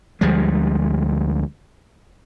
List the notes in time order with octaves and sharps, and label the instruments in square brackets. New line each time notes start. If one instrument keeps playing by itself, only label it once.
[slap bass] D2 F3 G3 G#3